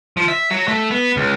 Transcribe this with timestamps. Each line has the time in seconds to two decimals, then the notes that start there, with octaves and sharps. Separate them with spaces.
0.17 F3
0.28 E5
0.50 F#3
0.68 A3
0.91 B3
1.17 C#2